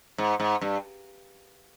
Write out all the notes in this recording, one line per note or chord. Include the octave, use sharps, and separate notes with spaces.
G#2
G#2
G2